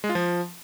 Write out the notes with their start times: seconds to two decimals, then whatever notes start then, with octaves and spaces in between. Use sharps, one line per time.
0.04 G#3
0.09 F4
0.15 F3